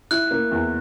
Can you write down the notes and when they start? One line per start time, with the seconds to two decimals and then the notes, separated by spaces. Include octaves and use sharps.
0.11 E4 F#6
0.31 A#3
0.51 E2